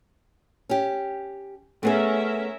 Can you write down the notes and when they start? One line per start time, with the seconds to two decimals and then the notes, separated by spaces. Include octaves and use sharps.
0.69 C#4 G4
1.83 A3 B3 C#4 G#4 A#4 E5